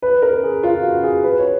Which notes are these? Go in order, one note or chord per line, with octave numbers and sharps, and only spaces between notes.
B4
A#4
G#4
F4
F#4
G#4
B4
C#5